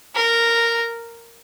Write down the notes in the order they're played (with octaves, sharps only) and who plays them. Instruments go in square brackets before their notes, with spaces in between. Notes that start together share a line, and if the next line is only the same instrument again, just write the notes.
[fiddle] A#4